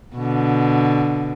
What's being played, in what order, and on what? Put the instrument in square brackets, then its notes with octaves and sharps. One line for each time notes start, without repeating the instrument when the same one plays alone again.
[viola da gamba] B2 D3